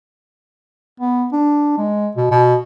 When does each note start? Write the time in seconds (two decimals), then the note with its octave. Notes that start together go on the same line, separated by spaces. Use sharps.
1.00 B3
1.32 D4
1.78 G#3
2.17 B2
2.31 B2